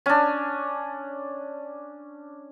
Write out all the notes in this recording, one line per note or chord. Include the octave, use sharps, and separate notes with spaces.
C#4 D4